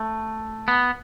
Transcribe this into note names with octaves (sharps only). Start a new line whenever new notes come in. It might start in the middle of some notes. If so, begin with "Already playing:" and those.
Already playing: A3
B3